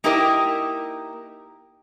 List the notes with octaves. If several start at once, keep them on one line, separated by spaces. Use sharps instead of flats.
A#3 D#4 E4 G4 A#4 D#5